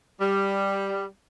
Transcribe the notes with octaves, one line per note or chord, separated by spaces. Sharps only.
G3